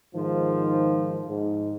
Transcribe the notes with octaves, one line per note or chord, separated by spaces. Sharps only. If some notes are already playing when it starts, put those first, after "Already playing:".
G#2 D#3 F3
G#2